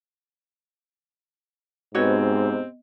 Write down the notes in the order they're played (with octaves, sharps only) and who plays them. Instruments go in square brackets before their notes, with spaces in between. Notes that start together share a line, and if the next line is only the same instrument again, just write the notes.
[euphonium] G#2 [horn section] C3 C4 [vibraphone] B3 D#5 [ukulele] F#4 B4 C#5